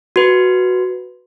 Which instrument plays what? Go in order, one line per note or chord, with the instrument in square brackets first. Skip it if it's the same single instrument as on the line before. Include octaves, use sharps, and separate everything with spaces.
[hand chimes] F#4 B4